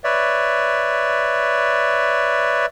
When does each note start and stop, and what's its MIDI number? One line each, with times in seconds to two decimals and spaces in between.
0.04 2.66 71
0.04 2.66 73
0.04 2.66 74
0.04 2.66 76